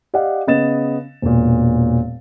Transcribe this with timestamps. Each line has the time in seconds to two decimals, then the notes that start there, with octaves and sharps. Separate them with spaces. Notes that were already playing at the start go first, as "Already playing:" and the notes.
0.14 G4 D5 D#5 F5 F#5
0.47 C#3 B3 D#5 A6 E7
1.22 E1 A#2